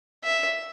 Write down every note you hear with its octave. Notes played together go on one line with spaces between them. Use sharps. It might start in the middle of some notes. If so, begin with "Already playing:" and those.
E5